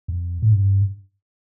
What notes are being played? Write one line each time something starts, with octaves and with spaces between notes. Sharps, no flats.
F2
A2
G2